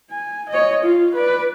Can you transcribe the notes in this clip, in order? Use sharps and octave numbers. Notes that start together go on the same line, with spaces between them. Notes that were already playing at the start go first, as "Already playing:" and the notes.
G#5
C#5 D#5
F4
B4 D5